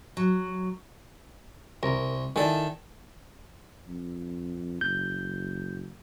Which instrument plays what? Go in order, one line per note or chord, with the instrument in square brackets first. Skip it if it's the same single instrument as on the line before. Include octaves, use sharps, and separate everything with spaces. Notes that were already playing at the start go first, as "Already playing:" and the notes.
[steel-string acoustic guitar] F#3
[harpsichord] C2 [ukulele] A#4
[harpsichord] D#3 A4 [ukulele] E4 D5 G#5
[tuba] F2
[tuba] F#1 [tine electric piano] G6